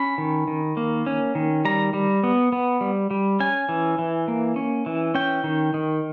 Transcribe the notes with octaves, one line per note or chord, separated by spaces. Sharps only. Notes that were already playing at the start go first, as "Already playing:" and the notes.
Already playing: C#4 B5
D#3
D#3
A#3
C#4
D#3
G3 A#5
G3
B3
B3
G3
G3
C#4 G#5
E3
E3
A#3
C#4
E3
C#4 G5
D#3
D#3